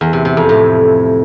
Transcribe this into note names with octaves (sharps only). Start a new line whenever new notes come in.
E2
C3
C3
F2
A2